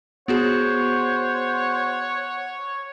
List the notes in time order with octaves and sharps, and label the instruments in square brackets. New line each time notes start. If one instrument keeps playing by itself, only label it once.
[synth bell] B3 F#4 G#4 [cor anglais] C5 [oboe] C#5 [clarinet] F#5